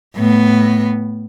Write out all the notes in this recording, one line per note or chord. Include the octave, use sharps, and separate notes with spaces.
A2 B3